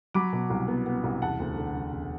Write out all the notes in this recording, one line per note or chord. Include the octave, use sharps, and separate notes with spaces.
F#3 B5 D6
B2
C2
B3
B3
C2
E1 F#5 A5
D2
D3
E1
E1